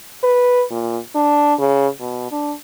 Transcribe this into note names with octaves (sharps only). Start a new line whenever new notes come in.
B4
A#2
D4
C#3
B2
D4